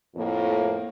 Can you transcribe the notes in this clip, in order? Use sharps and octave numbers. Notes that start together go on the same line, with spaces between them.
F2 A2 A#3